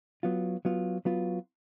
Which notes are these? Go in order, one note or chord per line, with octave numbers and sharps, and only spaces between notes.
F#3 B3 F4
F#3 B3 F4
F#3 B3 F4